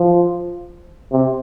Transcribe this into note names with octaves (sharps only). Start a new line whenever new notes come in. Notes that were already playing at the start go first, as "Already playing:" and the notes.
Already playing: F3
C3